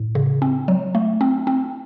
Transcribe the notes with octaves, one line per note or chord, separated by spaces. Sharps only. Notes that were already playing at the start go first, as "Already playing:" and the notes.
Already playing: A2
C#3
C4
F#3
A3
C4
C4